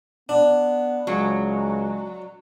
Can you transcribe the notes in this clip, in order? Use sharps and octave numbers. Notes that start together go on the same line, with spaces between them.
B3 D4
C#2 F#3 G#3